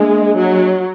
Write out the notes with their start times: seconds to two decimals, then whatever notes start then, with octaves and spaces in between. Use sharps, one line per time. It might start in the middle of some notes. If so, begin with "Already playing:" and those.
Already playing: G#3 A#3 D4 G#4 D#5 G#5
0.37 F#3